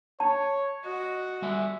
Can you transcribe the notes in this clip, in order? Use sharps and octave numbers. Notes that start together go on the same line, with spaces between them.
C#5 A5
F#4 D#5
G3 E5 G#5